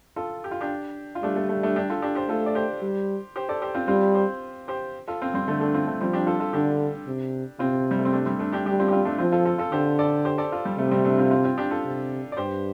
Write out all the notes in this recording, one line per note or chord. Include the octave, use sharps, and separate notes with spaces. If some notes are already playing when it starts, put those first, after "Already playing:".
F4 A4
G4
F4
D4 G4
F4
G3 A3 D4
A3
A3
A3 D4
D4 G4
F4 A4
D4 G4
G4 C5
A3 F4 A4
D5
G4 C5
G3
G4 C5
A4 D5
G4 C5
C4 F4
G3 C4 F4
G4 C5
G4 C5
F4 A4
C4 F4
G3 C4
D3 A3
A3 D4
C4 F4
A3
F3 G3 C4
D4 G4
F4 A4
F4 A4
D3 D4 G4
C3
C3 C4 F4
G3
A3
C4
A3 D4
G3 C4
A3 D4
D4 G4
G3 D4 G4
C4 F4
G4
C4 F4
A3 D4
F3 C4 F4
F4 A4
F4 A4
F4 A4
D3 G4 C5
A4 D5
G4 C5
A4 D5
F4 A4
G3
C3 A3
G3 C4
A3 D4
C4 F4
C4 F4
C4 F4
D4 G4
F4 A4
C3
D5
G2 G4 C5